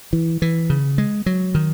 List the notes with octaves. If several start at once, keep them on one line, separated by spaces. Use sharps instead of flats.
E3
E3
C#3
G#3
F#3
D#3